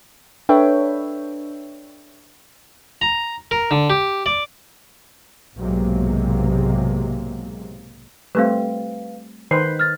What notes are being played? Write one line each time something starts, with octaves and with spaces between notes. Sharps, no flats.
D4 A4 B4 C#5 E5 G5
A#5
A#4
D3
G4
D5
B1 G#2 C3 F#3 G#3 A#3
G3 A3 C4 B4 F5
D#3 B4 C5 C7
F6 A6